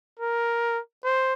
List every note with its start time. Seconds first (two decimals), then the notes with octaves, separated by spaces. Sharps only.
0.19 A#4
1.04 C5